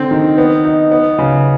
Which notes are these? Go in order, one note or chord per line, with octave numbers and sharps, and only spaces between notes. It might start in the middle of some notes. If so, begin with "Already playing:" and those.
Already playing: D3 C4
D#3
B3
D#4
B3
C#3